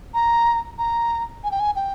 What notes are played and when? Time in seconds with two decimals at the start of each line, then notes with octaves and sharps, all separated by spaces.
0.14 A#5
0.78 A#5
1.44 G#5
1.51 G5
1.60 G#5
1.76 G5